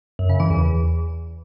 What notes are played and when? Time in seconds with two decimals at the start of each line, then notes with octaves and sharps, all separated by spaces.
0.19 F#2
0.29 C#3
0.40 E3
0.50 E2